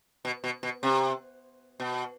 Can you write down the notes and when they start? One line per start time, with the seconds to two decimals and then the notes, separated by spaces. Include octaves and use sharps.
0.25 B2
0.44 B2
0.63 B2
0.83 C3
1.80 B2